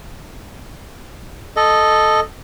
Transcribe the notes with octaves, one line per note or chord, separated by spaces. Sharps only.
A4 D#5